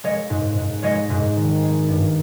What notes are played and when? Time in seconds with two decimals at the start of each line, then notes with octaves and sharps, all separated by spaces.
0.04 G#3 C#5 D#5
0.30 G#2
0.57 G#2
0.83 G#3 C#5 D#5
1.10 G#2
1.36 D#3
1.63 G#3
1.88 G2